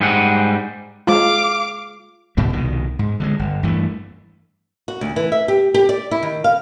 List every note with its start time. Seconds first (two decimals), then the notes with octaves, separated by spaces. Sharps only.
0.01 G#2 G3 D#4 G#4 F#5
1.07 G#3 F4 F5 D6
2.37 G#2 B2 D3 G3
2.53 C2 B2 D#3
2.99 G#2
3.20 D3 G3 G#3
3.39 G1
3.63 G2 E3 G#3 A3
4.88 F#4
5.01 D2
5.16 E3
5.32 E5
5.48 G4
5.74 G4
5.89 D5
6.11 E4
6.23 D#3
6.44 F5